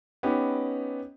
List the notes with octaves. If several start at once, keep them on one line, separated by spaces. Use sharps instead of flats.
B3 C#4 D#4 G4